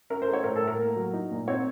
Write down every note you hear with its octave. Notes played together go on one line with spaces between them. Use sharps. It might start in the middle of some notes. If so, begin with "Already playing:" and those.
C#4 A#4
C5
A3
C#5
A2 A#4
A4
A2
A#4
A#3
F#3
D#4
A#2
C4 C#5